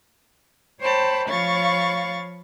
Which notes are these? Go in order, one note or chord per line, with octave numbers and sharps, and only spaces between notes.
C5 C#5 G5 A5 B5
F3 C#5 F5 B5 C#6 A6